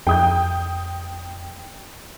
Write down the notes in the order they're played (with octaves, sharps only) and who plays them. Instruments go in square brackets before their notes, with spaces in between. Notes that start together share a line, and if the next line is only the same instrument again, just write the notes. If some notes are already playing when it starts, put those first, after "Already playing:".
[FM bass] F2 [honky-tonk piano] G5 D#6 G6